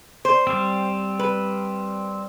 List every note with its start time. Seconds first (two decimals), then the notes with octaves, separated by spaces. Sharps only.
0.25 C5
0.47 G3 C4
1.19 B4